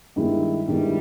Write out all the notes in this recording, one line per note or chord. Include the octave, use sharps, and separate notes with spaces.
G2 D#3 G#3 B3 E4
G2 D#3 G3 G#3 B3 E4